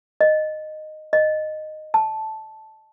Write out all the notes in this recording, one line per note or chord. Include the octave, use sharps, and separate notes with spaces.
D#5
D#5
A5